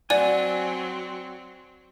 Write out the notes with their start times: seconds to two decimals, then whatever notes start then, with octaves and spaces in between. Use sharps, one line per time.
0.10 F#3 C4 D5 F#5 G#5 D#7